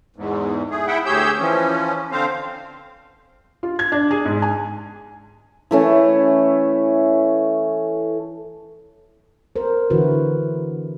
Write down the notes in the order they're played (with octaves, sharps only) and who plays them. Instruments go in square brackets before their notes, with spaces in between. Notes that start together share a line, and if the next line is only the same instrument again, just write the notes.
[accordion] E2 G#2
A3 G#4
E4 E5 F#5 G5
D2 G4 G#4 C#5 E6 G6
E3 F3 C#4
D3 C4 C5 F5
[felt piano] F4
G#6
D4
G#4
G#2
G#5
[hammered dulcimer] E3 A3 C#4
[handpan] A#4 C5
D3 E3 E4 F#4 B4